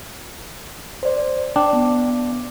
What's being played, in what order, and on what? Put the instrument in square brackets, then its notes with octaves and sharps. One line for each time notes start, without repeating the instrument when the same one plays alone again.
[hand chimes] C5 D5
[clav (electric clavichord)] D4 [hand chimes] G5
[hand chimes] B3